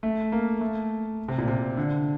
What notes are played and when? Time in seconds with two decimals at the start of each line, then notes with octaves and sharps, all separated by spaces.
0.03 A3
0.32 A#3
0.61 A3
1.28 C3
1.38 A#2
1.48 C3
1.77 D3